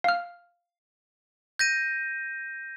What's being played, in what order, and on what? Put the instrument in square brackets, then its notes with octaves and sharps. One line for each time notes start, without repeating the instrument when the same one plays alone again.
[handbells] F5 F6
[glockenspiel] G6 A#6 D#7